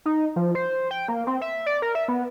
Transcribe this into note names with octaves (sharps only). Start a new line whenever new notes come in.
D#4
F3
C5
G5
A#3
C4
E5
D5
A#4
E5
B3